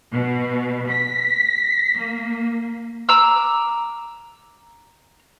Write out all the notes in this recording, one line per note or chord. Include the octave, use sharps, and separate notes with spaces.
B2
B6
A#3
A#5 D6 E6